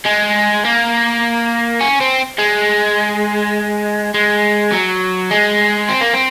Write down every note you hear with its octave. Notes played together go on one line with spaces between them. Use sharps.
G#3
A#3
C#4
C4
G#3
G#3
F#3
G#3
C4
A#3
C4